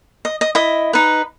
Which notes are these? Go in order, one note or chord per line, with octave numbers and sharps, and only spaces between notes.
D#5
D#5
E4 D#5
D#4 B4